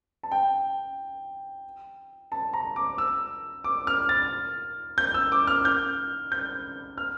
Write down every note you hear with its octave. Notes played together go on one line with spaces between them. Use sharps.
A5
G5
A5
A#5
D6
E6
D6
F6
A6
G6
E6
D6
F6
G6
G6
F6